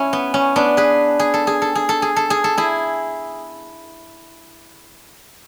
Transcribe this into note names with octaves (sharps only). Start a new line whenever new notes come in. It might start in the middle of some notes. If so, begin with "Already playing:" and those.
Already playing: C#4 E4
B3
C#4
B3 D4
G#4 B4
G#4
A4
G#4
A4
G#4
A4
G#4
A4
G#4
A4
E4 G#4